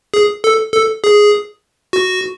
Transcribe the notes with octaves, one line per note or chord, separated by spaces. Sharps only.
G#4
A4
A4
G#4
F#4